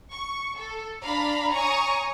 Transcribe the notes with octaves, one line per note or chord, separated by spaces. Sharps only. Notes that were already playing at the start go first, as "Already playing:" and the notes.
C#6
A4
D4 F5 A#5 B5
C#5 G#5 A#5 C#6 D#6